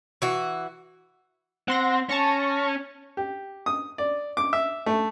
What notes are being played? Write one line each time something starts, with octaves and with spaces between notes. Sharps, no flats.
E3 F#4
C4 F#5 C6 A#6
C#4 A5 C#6 A#6
G4
D#6
D5
D6
E5
A3